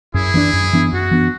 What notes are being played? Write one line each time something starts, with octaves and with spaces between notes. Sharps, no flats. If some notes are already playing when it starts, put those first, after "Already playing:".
F#2 E4 G#4
E3 B3 D4
F#2
E3 B3 D4
F#2 F#4
E3 B3 D4